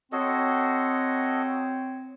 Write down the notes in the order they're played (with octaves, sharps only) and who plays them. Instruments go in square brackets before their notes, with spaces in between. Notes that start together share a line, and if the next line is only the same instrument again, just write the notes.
[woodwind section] C4 C#5 [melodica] F#4 A4 D#5